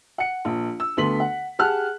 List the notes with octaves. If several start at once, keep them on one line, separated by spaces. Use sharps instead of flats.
F#5 C#7
A#1
E6
D2 B3 A4 C6 B6 F#7
F#5
G4 G#4 F#5 A5 F6 F#6